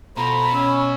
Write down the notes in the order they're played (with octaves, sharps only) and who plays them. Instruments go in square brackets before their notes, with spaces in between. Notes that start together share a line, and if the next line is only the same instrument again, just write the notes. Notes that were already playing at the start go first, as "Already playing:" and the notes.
[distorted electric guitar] B2 [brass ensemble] F4 A4 C5 [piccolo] A#5 [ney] B5
[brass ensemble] C#4 [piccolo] E6